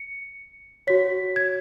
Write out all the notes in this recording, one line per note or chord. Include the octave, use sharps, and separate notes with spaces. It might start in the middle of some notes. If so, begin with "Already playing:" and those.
Already playing: C#7
F#4 C#5 B6
G#6